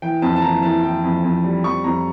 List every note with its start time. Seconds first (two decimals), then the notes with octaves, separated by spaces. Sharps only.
0.02 E3 G5
0.22 F2 A5
0.36 A5
0.42 E3 A#5
0.63 E3 A5
0.83 E3 G5
1.03 F2
1.24 F2
1.44 G3
1.64 F2 C#6
1.84 F2 A#5